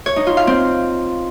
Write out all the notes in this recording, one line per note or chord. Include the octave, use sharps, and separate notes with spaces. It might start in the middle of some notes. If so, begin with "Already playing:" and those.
C#5
D#4
F4
F5
C4